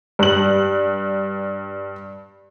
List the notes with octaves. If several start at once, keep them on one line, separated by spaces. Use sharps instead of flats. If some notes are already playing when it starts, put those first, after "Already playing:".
G2 F#7